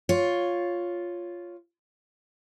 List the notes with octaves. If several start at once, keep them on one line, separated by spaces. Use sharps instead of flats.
F4 C#5